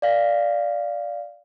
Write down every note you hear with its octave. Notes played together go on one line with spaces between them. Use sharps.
D5 F5